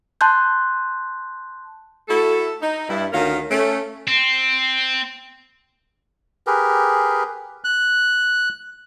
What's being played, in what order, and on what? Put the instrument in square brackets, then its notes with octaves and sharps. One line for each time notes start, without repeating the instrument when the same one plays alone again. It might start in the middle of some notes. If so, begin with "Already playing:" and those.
[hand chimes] A5 C6 F#6 G6
[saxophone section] A3 E4 F#4 A4
D#4
G2 E4
D2 D#3 C#4 F4 A#4 F5
A3 C#4
[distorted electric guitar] C4
[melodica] G4 G#4 A#4 B4
[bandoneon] F#6